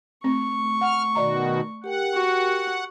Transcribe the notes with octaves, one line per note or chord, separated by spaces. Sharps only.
A3 C4 C#6
F#5 F6
B2 D#3 F#4 D5 D#5 A#5
G4 A#4 F#5 G5
F#4